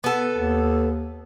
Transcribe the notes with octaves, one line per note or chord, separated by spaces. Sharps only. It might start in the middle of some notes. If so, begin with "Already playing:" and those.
B3 A4
D#2